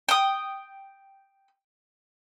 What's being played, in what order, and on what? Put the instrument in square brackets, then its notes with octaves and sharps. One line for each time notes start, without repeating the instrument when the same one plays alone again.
[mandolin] G5 D#6